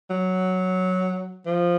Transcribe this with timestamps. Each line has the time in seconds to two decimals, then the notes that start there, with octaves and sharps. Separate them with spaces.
0.10 F#3
1.46 F3